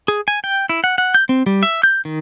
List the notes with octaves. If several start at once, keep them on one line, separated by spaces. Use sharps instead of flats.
G#4
G#5
G5
E4
F#5
F#5
G6
C4
G3
E5
G6
D#3